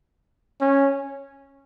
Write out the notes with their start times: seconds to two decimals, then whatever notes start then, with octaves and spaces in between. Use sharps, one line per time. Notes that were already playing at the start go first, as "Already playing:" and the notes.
0.60 C#4